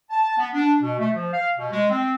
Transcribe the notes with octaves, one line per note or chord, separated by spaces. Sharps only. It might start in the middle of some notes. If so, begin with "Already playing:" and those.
A5
B3
D4
B2
A3
F3
F5
B2
G#3
C4